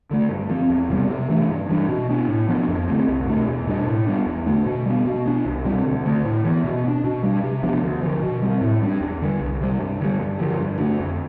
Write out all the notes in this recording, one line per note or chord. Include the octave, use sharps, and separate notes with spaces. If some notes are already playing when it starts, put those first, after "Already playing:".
D3 A3
G2
F3 C4
E2
C3 G3 B3
C3
E3 A3 D4
G2
E3 G3 D4
B2
B3 D4
A2
F3 B3 D4
F2
D3 A3 C4
C2
B2 A3 D4
E2
B2 G3 D4
A2
G3 B3 D4
E2
D3 A3 D4
B2
G3 B3
B2
B3 D4
C2
B2 G3 C4
D2
D3 A3
A2
E3 B3
B2
B3
D4
B2
G3 D4
C3
F3 B3 D4
D2
D3 F3
B2
G3 C4
A2
G3 B3 D4
E2
D3 G3
C2
C3 G3
G2
D3 G3
G2
D3 F3
G2
D3 A3 D4
F2